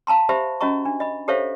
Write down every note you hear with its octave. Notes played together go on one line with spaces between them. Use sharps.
F5 A5 A#5 C6
G4 C5 E5 B5
C#4 F#4 D#5 A#5 C#6
D4
D#5 B5
G4 A4 C5 C#5 E5 F5